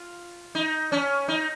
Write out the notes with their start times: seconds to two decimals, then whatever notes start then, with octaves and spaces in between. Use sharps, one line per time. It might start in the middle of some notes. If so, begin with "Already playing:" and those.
Already playing: F4
0.55 D#4
0.92 C#4
1.28 D#4